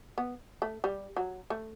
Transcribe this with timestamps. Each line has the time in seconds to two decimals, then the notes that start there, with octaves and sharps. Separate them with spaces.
0.18 B3
0.62 A3
0.84 G3
1.17 F#3
1.50 A3